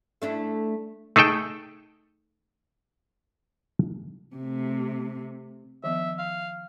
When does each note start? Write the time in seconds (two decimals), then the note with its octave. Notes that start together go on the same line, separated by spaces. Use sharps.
0.22 A3 D4 E4
1.16 A3 D#4 G#4 A4 G5
4.36 C3 A3
5.84 D#3 F3 B3 E5
6.19 F5